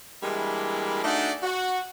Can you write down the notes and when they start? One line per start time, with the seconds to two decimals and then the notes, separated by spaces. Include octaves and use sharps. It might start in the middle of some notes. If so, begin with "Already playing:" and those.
0.23 E3 G3 G#3 A#3 D4 E4
1.04 A3 D4 D#4 F#4 G#4 D5
1.43 F#4